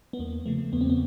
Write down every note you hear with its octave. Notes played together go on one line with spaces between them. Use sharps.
B3
E2 A#3
C#3 F3 A3
E2 B3
C4
B3